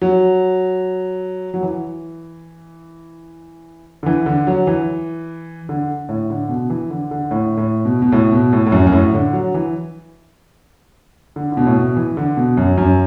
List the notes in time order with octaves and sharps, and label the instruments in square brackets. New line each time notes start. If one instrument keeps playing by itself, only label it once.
[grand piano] F#3
F#3
E3
D3
E3
D3
F#3
E3
D3
A2
D3
B2
E3
D3
D3
A2
A2
B2
B2
A2
B2
A2
A2
F#2
F#2
A2
D3
F#3
E3
D3
D3
B2
A2
B2
E3
D3
B2
F#2
F#2